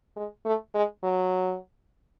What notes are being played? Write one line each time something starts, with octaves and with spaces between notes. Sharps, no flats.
G#3
A3
G#3
F#3